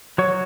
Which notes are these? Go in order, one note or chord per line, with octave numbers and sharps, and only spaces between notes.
F#3 C#5